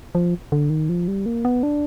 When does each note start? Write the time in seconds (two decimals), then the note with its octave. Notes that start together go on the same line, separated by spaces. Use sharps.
0.15 F3
0.52 D3
0.70 D#3
0.89 F3
1.08 G3
1.26 A#3
1.45 B3
1.63 D4